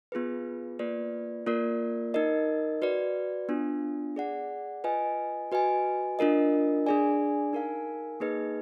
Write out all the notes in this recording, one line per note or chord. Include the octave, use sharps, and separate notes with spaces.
B3 F4 G#4 B4
A#3 F4 B4 D5
A#3 F4 A#4 D5
D#4 A#4 D#5
F#4 B4 D5
B3 D4 F4
G#4 D5 F#5
F4 B4 D#5 G#5
F#4 B4 D#5 G#5
D4 F4 A#4 D#5
D4 G#4 D5 G#5
D#4 A#4 F5 G#5
A#3 D#4 G#4 B4 D#5